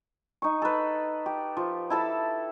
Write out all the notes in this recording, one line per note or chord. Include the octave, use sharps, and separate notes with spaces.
D#4 C#6
A4 B4
G4
F3
E4 A4 A5 B5